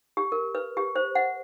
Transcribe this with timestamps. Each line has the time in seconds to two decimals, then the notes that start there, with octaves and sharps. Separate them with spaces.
0.17 G4
0.32 A#4
0.55 B4
0.77 G4
0.96 C5
1.15 F#5